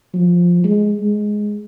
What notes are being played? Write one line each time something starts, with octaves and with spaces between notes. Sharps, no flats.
F3
G#3
G#3